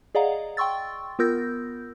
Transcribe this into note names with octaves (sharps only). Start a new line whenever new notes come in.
G#4 D5 D#5 F5 F#5 A#5
G5 C6 C#6 E6 A6
B3 F4 A#4 E6 G6 A#6